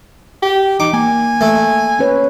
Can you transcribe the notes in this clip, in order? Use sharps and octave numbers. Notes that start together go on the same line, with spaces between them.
G4
D#4 D6
A#3 G#5
A3
C#4 B4 C#5